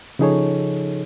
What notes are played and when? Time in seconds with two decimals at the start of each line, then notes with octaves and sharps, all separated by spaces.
0.19 C#3 F3 D#4 G#4 A4 C#5